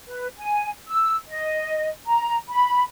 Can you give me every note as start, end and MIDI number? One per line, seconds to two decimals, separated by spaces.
0.07 0.27 71
0.37 0.70 80
0.88 1.16 88
1.28 1.89 75
2.06 2.37 82
2.48 2.83 83